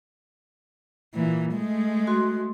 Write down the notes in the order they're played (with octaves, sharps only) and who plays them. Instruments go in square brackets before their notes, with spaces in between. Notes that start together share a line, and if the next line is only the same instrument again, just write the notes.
[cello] A#2 E3
G#3 A3
[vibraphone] F#4 C6